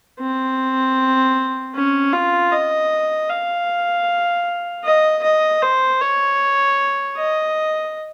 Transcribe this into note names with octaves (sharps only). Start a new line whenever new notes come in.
C4
C#4
F4
D#5
F5
D#5
D#5
C5
C#5
D#5